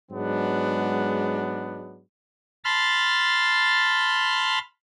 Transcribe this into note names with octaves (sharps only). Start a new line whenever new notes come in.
G#2 F#3 G#3 B3 D4
A5 B5 C6 F6 A6